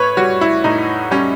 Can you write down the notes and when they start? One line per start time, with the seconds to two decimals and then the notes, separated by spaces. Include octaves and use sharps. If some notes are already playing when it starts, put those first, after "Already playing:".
Already playing: A2 B4 C#5
0.17 G3 F#4
0.41 E4
0.64 A2 D#4
1.11 G3 C#4